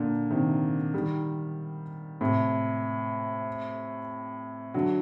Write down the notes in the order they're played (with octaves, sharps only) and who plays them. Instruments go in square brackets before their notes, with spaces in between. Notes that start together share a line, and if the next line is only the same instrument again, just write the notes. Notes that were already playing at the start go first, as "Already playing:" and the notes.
Already playing: [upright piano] A#2 D3
C3 D#3
D#3 G3
A2 C3
D3 F#3